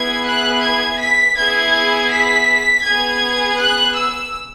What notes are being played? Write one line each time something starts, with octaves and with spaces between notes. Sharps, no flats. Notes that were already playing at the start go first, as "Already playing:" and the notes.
Already playing: B3 E4 G#4 G#6
F#6
G#6
B6
B3 E4 G#4 G#6
B6
B3 G#4 G#6
F#6
E6